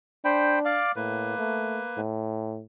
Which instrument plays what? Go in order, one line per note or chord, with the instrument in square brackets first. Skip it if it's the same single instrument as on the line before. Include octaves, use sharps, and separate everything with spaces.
[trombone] D4 [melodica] C5 G5 B5
[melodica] D5 F5 D6
[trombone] A2 [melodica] A#3 B4
[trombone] A3
A2